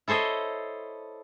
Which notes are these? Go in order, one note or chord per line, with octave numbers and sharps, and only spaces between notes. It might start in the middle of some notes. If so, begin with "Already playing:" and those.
E4 A4 C5 C#5 D#5